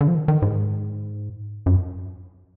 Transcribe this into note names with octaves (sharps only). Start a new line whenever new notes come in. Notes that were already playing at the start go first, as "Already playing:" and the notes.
D3
F3
D#3
D#3
G#2
F#2